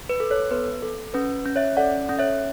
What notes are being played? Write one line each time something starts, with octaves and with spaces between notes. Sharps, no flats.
B4
A4
A4 C#5
B3 B4
A4
C#4 B4
C#4
C#5 E5
A4 D5 F#5
C#4
C#5 E5